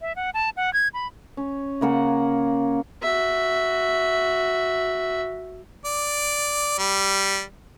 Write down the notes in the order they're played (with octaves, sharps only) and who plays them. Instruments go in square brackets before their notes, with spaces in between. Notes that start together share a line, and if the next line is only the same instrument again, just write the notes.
[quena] E5
F#5
A5
F#5
G#6
B5
[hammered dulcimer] C#4
C#3 A#3 F#5 G#5
[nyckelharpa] F#4 E5
[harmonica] D5
G3